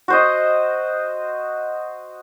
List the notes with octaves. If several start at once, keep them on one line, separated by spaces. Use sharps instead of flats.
F#4 C5 D#5